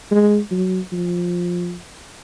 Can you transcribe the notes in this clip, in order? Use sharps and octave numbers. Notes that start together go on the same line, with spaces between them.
G#3
F#3
F3